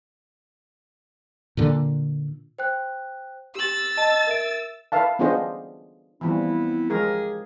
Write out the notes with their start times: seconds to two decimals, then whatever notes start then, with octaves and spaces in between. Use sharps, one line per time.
1.57 A#2 D3
2.58 C5 G5 F#6
3.55 G4 E6 A6 F#7
3.97 D#5 A5
4.27 A#4 E5 D7
4.92 B4 E5 F5 A5
5.19 B3 D4 F4 G#4 C5 D#5
6.21 E3 F3 G3 B3 C4 E4
6.90 F3 G#3 G4 G#4 A#4